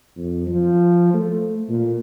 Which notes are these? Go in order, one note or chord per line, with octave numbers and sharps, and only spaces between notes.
F2
F3
A3
A#2